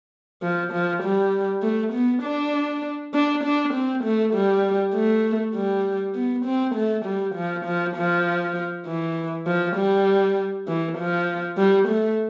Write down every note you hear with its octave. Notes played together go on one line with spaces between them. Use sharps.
F3
F3
G3
A3
B3
D4
D4
D4
C4
A3
G3
A3
G3
B3
C4
A3
G3
F3
F3
F3
E3
F3
G3
E3
F3
G3
A3